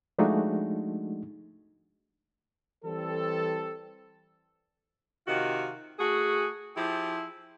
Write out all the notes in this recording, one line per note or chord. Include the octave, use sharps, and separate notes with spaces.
F3 G#3 A3 D4 D#4 F#4
E3 G3 C4 A4
C3 D#3 F4 F#4
A3 F#4 G#4
F3 E4 G4 G#4